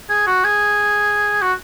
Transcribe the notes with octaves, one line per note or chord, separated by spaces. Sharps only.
G#4
F#4
G#4
F#4